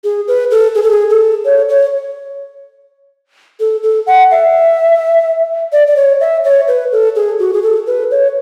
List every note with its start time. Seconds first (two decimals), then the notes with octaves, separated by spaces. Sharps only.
0.04 G#4
0.28 B4
0.51 A4
0.75 G#4
0.83 A4
0.91 G#4
1.10 A4
1.45 C#5
1.69 C#5
3.60 A4
3.83 A4
4.07 F#5
4.31 E5
5.72 D5
5.87 D5
5.96 C#5
6.20 E5
6.44 C#5
6.68 B4
6.92 A4
7.16 G#4
7.39 F#4
7.54 G#4
7.63 A4
7.87 B4
8.11 C#5